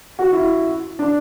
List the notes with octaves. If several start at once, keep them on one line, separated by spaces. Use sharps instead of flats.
F#4
E4
D4